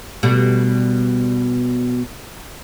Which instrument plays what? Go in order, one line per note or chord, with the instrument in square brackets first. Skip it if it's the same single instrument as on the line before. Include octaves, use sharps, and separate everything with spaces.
[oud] B2 G3 A3